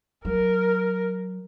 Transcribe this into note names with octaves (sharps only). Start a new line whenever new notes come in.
F#3 A#4